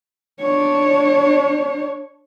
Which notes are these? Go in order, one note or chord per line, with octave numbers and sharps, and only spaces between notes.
D4 C#5